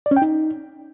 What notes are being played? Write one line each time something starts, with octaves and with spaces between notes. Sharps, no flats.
D5
C#4
G5
D#4